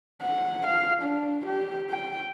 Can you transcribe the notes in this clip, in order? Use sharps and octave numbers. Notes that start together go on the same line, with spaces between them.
F#5
F5
D4
G4
G5